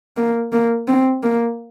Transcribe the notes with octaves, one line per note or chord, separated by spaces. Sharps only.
A#3
A#3
C4
A#3